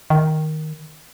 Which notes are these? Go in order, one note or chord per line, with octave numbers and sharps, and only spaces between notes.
D#3